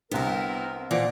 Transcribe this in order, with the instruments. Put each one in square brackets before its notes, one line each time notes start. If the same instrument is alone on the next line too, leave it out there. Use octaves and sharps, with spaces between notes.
[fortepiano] C2 D3 [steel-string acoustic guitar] B3 E4 [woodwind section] C4 A#4
[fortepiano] A#2 F3 [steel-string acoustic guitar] E3 A#3 F#5 [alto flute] D5